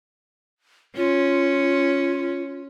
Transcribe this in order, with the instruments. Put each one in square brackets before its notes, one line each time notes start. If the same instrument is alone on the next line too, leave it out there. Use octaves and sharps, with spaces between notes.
[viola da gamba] C#4 [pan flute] F4